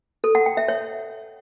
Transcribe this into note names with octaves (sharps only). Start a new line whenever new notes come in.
A4
F#5
G5
E5
C#5